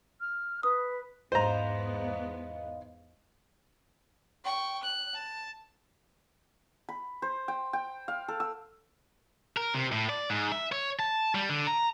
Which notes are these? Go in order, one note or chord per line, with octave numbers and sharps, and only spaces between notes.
F6
B4 D#6
E2 G#2 B3 C5 D#5 F5 A#5
G5 C#6
F#6
A5
B5
C5
G5
G5
F5
A4
E6
A#4
C3
A2
D5
G#2
E5
C#5
A5
G3
D3
A#5